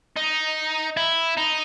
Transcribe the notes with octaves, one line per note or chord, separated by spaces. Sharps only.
D#4
E4
D#4